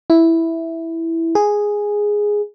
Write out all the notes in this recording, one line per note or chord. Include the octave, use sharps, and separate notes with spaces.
E4
G#4